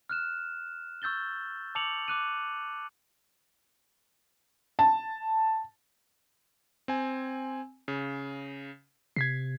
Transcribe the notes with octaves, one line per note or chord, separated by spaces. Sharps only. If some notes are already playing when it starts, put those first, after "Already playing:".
F6 F#6 E7
C#6 E6 G6 A6 G7
A5 D6 E6 C#7 F7 F#7
D6 F#6 D#7
A5
C4 G#5
C#3
C3 G#6 B6 C7